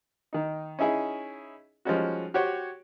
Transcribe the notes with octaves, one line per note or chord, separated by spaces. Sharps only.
D#3 D#4
C#4 D#4 E4 G#4
F3 G3 G#3 C#4 D#4 F#4
F#4 G4 C5 C#5 F#5 G5